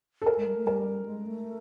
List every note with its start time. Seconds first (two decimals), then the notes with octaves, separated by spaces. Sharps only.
0.22 A4
0.26 A#4
0.38 G#3
0.46 G3
0.57 A3
0.66 G3 A#4
1.06 G#3
1.26 A3